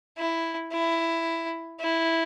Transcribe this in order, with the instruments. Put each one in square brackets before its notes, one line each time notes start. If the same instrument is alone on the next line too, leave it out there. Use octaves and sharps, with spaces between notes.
[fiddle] E4
E4
E4